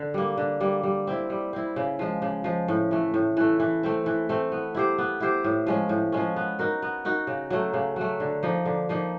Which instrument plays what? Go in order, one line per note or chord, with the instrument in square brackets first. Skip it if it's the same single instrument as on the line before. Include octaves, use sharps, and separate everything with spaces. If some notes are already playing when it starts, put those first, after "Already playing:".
Already playing: [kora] D3
G3 A#3
D3
G3 A#3
G3
C4 E4
G3
C4 E4
C#3
F3 G#3
C#3
F3 G#3
A2
E3 A3
A2
E3 A3
E3
A3 C4
E3
A3 C4
B3
E4 G4 C5
B3
E4 G4 C5
A2
F3 G#3 C#4
A2
F3 G#3 C#4
B3
D#4 F#4 A#4
B3
D#4 F#4 A#4
C#3
F#3 A3
C#3
F#3 A3
D3
F3 A#3 D#4
D3
F3 A#3 D#4